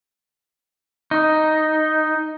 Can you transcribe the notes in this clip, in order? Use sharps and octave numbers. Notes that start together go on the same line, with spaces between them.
D#4